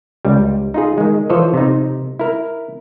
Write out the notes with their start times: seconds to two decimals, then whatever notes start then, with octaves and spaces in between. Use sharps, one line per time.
0.25 C#2 G3
0.74 D#4 F4 G#4
0.98 D#3 G#3
1.30 E3 F3 A4 C5 C#5 D#5
1.54 C3 D#4
2.19 E4 A#4